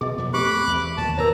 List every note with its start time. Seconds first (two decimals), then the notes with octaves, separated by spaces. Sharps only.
0.01 B2 G#4 D#5
0.18 F2 A#2 B3
0.34 A3 C4 G4 B5 D6 F#6
0.67 E2 A3
0.97 D#2 A#2 D#3 A5
1.18 D#2 A2 A#4 C#5 A#5